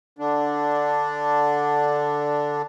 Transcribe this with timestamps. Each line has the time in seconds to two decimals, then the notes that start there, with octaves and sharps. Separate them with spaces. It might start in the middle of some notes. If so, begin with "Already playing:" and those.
0.19 D3 D4